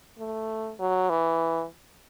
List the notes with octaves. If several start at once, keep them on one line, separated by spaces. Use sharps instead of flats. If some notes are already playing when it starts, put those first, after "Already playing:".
A3
F#3
E3